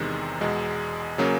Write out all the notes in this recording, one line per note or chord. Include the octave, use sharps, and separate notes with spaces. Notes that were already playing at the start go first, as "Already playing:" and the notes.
Already playing: E2 C3 D#3 G#3
E2 B2 G#3
C#3 F#3 A#3 C#4